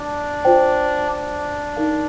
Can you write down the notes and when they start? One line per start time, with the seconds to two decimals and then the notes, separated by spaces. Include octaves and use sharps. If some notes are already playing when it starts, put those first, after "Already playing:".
Already playing: D4
0.45 F4 C5 G5
1.10 D4
1.76 D#4 A#4 F5